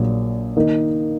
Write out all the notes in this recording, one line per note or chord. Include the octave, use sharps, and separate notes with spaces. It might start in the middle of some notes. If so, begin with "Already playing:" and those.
Already playing: A#1 A#2 F#3
D#3 A#3 D#4